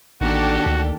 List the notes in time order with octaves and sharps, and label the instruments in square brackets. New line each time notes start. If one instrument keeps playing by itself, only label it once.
[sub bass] A1 [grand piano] D#3 A#3 [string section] D4 G4 A4 [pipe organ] F#4
[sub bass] D2